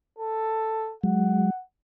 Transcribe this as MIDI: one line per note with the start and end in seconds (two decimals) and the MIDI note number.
0.19 0.95 69
1.04 1.50 54
1.04 1.50 56
1.04 1.61 78